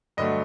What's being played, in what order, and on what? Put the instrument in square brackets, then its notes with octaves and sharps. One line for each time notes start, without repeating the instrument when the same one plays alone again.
[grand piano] G2 D3 F#3 A3 D#5